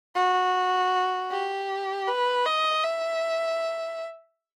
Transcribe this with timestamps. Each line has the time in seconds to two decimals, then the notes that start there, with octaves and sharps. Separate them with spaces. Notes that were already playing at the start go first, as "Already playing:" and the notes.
0.16 F#4
1.31 G4
2.07 B4
2.46 D#5
2.84 E5